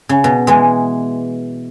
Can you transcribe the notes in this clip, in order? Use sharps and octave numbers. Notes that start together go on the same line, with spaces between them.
C#3
B2
E3 G#3